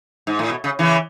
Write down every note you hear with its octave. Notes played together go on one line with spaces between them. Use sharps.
G#2
A2
B2
C#3
C#3 E3